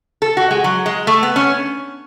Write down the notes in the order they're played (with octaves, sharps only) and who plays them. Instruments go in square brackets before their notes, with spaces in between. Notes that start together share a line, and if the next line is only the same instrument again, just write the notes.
[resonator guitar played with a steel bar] A4
F#4
G#3
F#3
G#3
A3
B3
C#4